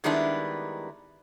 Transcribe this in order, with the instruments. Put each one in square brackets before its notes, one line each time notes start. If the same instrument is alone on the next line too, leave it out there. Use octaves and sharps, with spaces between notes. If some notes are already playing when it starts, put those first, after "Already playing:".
[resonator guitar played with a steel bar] D#3 G3 G#3 B3 D4 E4